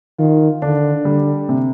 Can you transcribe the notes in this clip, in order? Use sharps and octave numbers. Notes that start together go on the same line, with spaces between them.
D#3 F4
D3 D4
D3 G3
C3